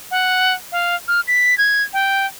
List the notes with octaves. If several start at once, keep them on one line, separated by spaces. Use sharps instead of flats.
F#5
F5
F6
B6
G#6
G5